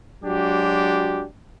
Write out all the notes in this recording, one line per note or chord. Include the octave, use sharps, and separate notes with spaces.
F#3 G#3 D4 F#4 G4